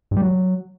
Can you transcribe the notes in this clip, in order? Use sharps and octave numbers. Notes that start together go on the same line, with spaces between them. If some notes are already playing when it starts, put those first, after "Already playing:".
G2
G3
F#3